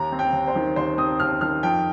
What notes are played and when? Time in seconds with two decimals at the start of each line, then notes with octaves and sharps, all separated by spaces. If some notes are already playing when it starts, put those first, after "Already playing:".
Already playing: D#2 A#5
0.12 C4
0.19 G5
0.33 D#2
0.48 C5
0.55 D#3
0.76 D#2 C5
0.98 C4 D#6
1.20 D#2 F6
1.41 D#3 F6
1.63 F2 G5